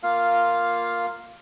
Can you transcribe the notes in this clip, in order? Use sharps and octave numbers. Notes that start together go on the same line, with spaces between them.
A#3 F4 F5